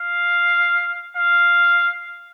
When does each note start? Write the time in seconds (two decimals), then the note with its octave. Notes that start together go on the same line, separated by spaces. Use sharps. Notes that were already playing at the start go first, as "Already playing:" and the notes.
Already playing: F5
1.17 F5